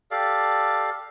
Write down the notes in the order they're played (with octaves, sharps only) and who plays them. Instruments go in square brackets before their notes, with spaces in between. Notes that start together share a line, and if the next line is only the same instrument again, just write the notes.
[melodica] G4 A4 D5 F5